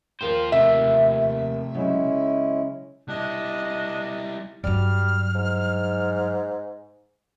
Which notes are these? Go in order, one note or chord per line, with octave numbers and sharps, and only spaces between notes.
D#2 F4 A#4 C5 G5
C3 A3 E5
C#3 F#3 G#3 C#4 E4
G3 D4 E4 D#5
G2 F#3 G3 F6
G#2